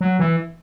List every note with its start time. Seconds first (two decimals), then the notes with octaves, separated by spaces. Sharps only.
0.01 F#3
0.19 E3